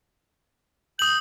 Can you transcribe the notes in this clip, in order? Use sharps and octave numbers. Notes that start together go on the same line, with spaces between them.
D#6 G6 F#7